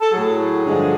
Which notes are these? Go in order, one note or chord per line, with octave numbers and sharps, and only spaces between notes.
A4
A2 F#3 G#4
G2 D3 F3 G#3